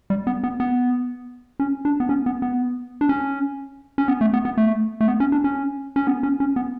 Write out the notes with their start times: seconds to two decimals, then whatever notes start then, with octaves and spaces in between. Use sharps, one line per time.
0.10 G3
0.27 B3
0.43 B3
0.60 B3
1.60 C#4
1.85 D4
2.00 B3
2.09 C#4
2.26 B3
2.42 B3
3.01 D4
3.09 C#4
3.98 C#4
4.08 B3
4.21 A3
4.33 B3
4.45 B3
4.57 A3
5.01 A3
5.08 B3
5.20 C#4
5.32 D4
5.44 C#4
5.96 C#4
6.07 B3
6.23 C#4
6.40 C#4
6.56 B3